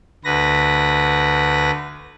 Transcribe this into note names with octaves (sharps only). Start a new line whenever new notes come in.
D2 B4 A#6